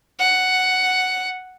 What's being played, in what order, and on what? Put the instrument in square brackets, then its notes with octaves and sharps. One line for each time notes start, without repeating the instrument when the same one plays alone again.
[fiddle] F#5